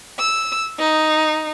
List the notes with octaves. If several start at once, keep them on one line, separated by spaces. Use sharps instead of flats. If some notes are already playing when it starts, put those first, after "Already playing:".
E6
D#4